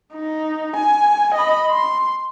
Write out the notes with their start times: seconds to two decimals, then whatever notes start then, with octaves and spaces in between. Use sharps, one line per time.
0.13 D#4
0.76 G#5
1.34 D#5 B5
1.70 C6